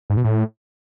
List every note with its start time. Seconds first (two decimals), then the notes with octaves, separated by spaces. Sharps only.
0.10 G#2
0.17 B2
0.24 A2